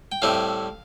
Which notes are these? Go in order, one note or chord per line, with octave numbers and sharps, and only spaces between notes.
G5
A2 G3 C4 E4 F5